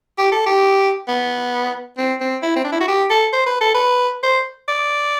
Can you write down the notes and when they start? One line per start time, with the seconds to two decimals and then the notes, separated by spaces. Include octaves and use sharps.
0.18 G4
0.32 A4
0.46 G4
1.08 B3
1.98 C4
2.20 C4
2.42 E4
2.56 C4
2.64 D4
2.72 E4
2.80 F#4
2.88 G4
3.10 A4
3.33 C5
3.46 B4
3.61 A4
3.74 B4
4.23 C5
4.68 D5